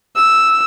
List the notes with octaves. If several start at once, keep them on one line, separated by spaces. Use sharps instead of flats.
E6